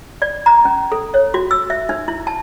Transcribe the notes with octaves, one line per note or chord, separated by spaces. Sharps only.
D5
A#5
C#4
A4
C#5
F#4
E6
E5
D#4
E4
A5